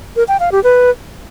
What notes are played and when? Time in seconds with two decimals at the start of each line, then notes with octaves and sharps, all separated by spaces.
0.16 A#4
0.28 G5
0.40 F5
0.52 G4
0.64 B4